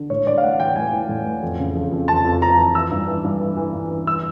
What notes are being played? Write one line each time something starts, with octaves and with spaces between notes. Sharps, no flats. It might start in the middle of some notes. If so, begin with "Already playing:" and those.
Already playing: D3
A2 C#5
A2 D5
F5
E3 F#5
E3 G5
A2 G#5
E3
A2
E3
F2
C#3
F2
F2
F2 A5
F2
F2 A#5
E3
E3 E6
G2
E3
G2
E3
E3
G2
E3
E3 E6